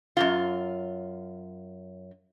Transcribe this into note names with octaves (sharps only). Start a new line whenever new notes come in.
F#2 A#2 F4